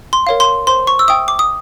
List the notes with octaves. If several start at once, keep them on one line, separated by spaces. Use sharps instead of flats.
C6
A#4 C#5 F5
C6
C5 C6
C#6
E6
E5 G5 D#6
D6
D#6